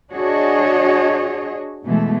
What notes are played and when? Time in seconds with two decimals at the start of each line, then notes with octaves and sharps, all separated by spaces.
0.11 D4 F#4 G#4 C#5 D#5
1.84 B2 E3 G#3 A3